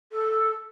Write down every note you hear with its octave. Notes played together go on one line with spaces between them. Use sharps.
A4